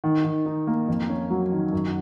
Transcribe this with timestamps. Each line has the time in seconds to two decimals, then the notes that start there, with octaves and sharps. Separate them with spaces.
0.04 D#3
0.25 D#3
0.46 D#4
0.67 A#3
0.88 F2
1.09 C#4
1.30 F#3
1.52 D#3
1.73 F#2